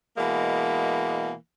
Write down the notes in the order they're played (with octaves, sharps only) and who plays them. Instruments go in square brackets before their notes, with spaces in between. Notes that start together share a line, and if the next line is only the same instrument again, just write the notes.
[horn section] B2 E3 G#3 A#3